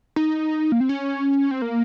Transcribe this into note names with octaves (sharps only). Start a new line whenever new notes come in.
D#4
A#3
C4
C#4
C4
A#3